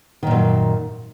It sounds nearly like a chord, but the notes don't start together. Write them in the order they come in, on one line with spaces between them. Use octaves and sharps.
D#3 A#2 F#2